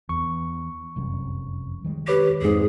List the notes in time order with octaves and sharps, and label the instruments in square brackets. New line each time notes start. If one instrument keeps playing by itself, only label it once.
[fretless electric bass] E2 [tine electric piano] C#6
[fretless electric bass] F1 C2 F#2
D#3 G3 G#3
[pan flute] G4 [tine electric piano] B4 C#5 D6
[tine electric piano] F2 G#2 [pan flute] G#4